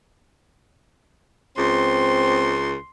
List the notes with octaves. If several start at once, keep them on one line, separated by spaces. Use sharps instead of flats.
C#2 C4 C6